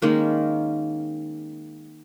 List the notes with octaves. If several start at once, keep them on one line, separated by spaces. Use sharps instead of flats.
D#3 G#3 A#3 C#4